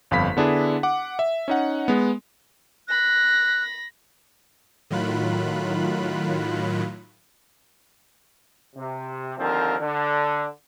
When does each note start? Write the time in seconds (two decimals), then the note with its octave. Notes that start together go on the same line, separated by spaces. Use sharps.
0.11 G1 F2 F5 B5 B6
0.37 D3 B3 D4 E4 G#4
0.83 F#5 D6
1.19 E5
1.48 C#4 D#4 F#5
1.88 G#3 B3
2.88 B5 F#6 A#6
4.90 A2 D#3 F#3 F4 B5 F#6
8.76 C3
9.38 D#2 D3 F3 C4 A#4
9.80 D3